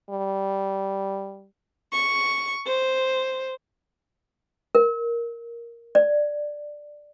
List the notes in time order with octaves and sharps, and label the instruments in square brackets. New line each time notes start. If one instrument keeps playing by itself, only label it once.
[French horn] G3
[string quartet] C#6
C5
[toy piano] A#4
D5